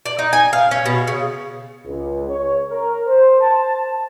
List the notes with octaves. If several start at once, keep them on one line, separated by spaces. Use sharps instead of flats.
D5
D#4
G#5
F5
C#4
B2
C#3
C#2
C#5
A#4
C5
A5